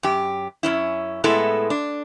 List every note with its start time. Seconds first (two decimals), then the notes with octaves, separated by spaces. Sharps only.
0.03 F#2 G4
0.63 F#2 C#4 E4
1.24 A2 G#3 B3 E4 A4
1.70 D4